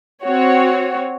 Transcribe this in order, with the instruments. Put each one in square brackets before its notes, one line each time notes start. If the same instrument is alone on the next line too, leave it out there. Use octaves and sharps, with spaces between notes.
[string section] C4 F#4 C#5